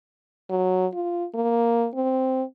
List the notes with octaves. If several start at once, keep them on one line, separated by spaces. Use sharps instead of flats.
F#3
F4
A#3
C4